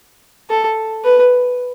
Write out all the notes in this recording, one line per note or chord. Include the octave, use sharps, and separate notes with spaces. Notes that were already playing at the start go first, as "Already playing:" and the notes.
A4
B4